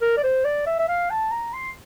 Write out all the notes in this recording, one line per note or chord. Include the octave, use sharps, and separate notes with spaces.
A#4
D5
C5
D5
E5
E5
F5
A5
A#5
C6